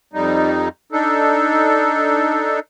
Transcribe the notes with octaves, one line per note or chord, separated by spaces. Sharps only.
F2 G3 D#4
D4 D#4 A4